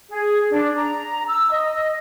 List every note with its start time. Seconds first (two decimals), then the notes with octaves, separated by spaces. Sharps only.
0.09 G#4
0.50 D4
0.75 A#5
1.27 E6
1.51 D#5